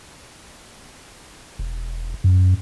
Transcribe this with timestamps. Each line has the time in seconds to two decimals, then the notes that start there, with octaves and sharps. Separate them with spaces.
1.59 E1
2.24 F#2